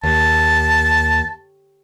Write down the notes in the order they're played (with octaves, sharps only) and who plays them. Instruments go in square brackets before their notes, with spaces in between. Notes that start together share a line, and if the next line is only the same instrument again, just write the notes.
[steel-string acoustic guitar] D#2 [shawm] A5